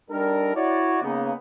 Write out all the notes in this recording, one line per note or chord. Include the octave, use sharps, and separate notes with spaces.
G3 D4 D#4 A4 A#4
E4 F#4 C#5 D5
C#3 A#3 B3 D#4